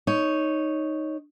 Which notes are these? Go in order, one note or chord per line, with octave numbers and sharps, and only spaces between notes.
D#4 C#5